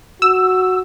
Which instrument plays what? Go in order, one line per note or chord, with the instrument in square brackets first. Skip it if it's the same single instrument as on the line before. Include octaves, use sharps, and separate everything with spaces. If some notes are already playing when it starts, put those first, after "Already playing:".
[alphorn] F#4 [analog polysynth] E6